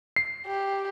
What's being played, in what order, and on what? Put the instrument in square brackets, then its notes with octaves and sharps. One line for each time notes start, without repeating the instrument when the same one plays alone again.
[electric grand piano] C7
[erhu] G4